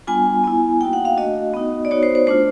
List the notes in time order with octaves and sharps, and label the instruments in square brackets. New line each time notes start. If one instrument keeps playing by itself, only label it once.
[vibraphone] G3 B3 D4 F4 G#5
B3 E4
A#3 D#4 F#4 G5
F#5
F5
A3 D4 F#4 D#5
B3 D#4 F#4
D5
B3 D#4 F#4 C#5
C5
C5
A3 D4 F4 C5